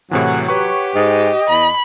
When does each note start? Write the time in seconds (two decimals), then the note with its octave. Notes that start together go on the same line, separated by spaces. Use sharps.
0.11 A2 C3 E3 F#3 G#4 C#5 F#5
0.48 G4 B4 C#5 F#5 C#6
0.95 G#2 D#5
1.50 E2 B5